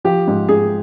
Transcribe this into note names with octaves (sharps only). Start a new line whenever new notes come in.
F3 G4
G#2
G#2 G#4